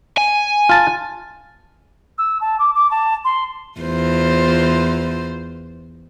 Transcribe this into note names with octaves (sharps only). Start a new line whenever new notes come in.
G#5
F4 A5
E6
A5
D6
D6
A5
C6
E2 F4 C5